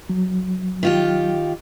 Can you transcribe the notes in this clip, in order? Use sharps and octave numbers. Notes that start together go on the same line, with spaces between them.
F#3
D#3 F4 G4